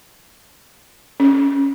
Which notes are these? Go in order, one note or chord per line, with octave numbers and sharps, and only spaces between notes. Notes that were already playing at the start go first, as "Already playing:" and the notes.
C#4